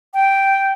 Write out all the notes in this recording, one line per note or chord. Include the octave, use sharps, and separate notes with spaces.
G5